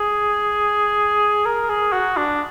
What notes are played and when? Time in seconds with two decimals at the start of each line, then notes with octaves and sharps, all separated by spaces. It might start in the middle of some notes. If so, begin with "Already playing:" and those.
Already playing: G#4
1.46 A#4
1.70 G#4
1.93 F#4
2.17 D4